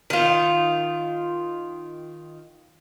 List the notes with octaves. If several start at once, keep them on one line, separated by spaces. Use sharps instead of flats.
D#3 F4